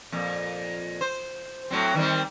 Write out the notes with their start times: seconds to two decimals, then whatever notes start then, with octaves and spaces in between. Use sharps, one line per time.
0.12 F2 A#2
1.01 C5
1.71 A2 F#3 C4
1.95 D#3 G3 C4